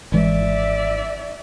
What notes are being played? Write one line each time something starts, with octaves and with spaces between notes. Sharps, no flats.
G#1 E3 G#3 D5 E5